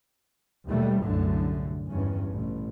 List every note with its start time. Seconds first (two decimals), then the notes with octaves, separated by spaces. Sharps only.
0.68 D#2 B2 G3 A3
1.05 C2 F#2 A2 D3 A3
1.89 G#1 E2 G2 C#4
2.31 A1 B2